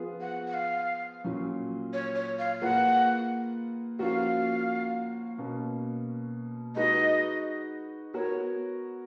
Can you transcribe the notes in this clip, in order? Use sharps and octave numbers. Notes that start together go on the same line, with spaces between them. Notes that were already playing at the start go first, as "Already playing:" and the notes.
Already playing: F3 B3 F4 G#4
F#5
F#5
F5
A#2 F#3 C#4
C#5
C#5
F5
A#3 F4 G#4 B4 F#5
F3 A#3 C#4 F#4 F5
B2 A#3 C#4
G#3 D#4 F#4 B4 D#5
B3 F#4 A#4 C#5